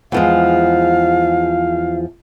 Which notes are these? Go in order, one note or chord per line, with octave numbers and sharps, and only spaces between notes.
E2 F3 G#3 F5